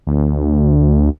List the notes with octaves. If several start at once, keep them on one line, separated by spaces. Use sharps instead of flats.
D2